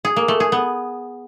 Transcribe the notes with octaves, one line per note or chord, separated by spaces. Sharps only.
G#4
A#3
A3
G#4
B3